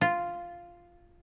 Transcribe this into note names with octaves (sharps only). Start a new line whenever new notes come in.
F4